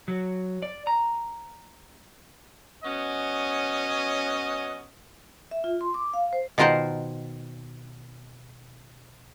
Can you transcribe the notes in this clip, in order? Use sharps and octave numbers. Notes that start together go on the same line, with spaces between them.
F#3
D5
A#5
F#3 B3 C#4 D#5
E5
F4
C6
D6
F5
C5
B2 D#3 F4 A#4 C5 F#5